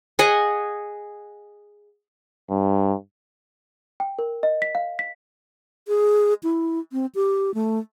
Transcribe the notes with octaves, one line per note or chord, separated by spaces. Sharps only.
G#4 D#5 F#5 G#5
G2
G5
A#4
D#5
B6
F5
B6
G#4
E4
C4
G4
A3